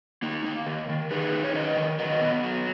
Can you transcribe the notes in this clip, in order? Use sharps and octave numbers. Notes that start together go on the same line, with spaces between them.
A#3 D#4
A#3
D#3
D#3
D#4 G#4 B4
D#4
C#5
D#3 B4 D#5
D#3
F#3 B4 D#5
B3
F#3